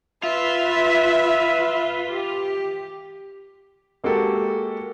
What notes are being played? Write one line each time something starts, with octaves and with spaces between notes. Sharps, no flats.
F4 B4 E5
G4
G#3 A#3 F#4 G4 A4